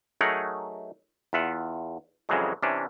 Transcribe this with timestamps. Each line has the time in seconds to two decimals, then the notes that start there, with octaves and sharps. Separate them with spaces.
0.21 F#3 A3 D#4 G#4 A#4 F#5
1.33 E2 F4 E5 F#5
2.29 F2 C#3 E3 F#3 G#3
2.63 C3 E3 C#4 D4